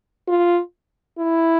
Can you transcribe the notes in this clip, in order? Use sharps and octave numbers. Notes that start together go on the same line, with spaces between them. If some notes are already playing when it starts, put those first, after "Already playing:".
F4
E4